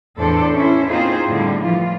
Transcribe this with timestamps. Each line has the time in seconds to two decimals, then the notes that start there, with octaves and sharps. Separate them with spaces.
0.18 E2 A2 D4 A4 C5 D5
0.55 C#4 E4 C5
0.87 A#3 C4 D#4 F4 G#4 C5
1.28 A2 D3 G3
1.60 E3 F3 F4